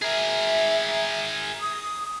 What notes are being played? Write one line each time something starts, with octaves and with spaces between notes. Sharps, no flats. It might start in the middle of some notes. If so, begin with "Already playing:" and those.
G#4 A#4 E5
D#6